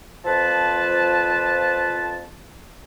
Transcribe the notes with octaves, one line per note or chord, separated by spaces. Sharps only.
F2 F3 B4 A5